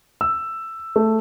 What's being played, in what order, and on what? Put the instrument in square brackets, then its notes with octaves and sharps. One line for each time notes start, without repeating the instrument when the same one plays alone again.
[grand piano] E6
A3